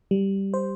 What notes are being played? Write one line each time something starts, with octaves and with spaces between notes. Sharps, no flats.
G3
C5